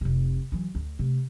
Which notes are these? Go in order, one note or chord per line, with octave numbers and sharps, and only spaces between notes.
F1 C3
E3 F#3
D2
C3 A3